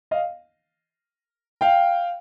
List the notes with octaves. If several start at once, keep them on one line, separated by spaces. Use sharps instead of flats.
D#5 F5
F5 G5